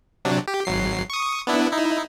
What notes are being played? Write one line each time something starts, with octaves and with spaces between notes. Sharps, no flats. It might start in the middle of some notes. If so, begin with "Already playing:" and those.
C3 F#3 D4
G4
G#1 F#3 C7
C#6 D#6
B3 D4 E4
D#4 E4